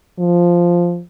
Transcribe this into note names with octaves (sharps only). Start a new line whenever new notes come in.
F3